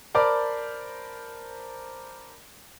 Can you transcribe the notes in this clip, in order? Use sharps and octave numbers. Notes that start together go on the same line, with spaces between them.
A#4 C5 D5 A5 B5 D6